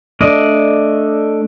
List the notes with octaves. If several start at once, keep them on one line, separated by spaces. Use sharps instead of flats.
A3 D4 D5 D#5